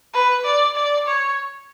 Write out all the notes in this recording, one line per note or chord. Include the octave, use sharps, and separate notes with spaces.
B4
D5
D5
C#5